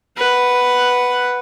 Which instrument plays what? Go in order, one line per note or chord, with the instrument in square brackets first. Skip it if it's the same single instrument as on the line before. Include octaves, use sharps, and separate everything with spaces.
[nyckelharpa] B4 F#5